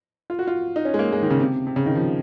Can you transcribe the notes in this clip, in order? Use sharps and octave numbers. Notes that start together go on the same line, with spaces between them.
F4
F#4
F4
D#4
C#4
G#3
A#3
G#3
D#3
C#3
C3
C3
C#3
D#3
F3